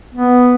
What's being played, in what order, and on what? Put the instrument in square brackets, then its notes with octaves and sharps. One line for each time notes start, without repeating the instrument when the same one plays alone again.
[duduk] B3